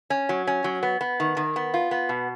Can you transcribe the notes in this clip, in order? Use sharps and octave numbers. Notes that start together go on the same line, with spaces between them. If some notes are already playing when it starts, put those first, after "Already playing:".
C#4
F#3
C#4
F#3
B3
B3
D#3
D#3
B3
F4
B3
B2